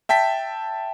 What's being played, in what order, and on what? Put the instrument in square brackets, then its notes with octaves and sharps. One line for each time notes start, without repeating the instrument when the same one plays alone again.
[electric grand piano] E5 G5 A5 B6